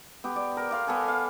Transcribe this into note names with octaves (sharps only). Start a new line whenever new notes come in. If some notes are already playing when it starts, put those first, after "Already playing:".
B3 G4
D5
A#4
D5 F5 C6
B3 A4 G#5
F5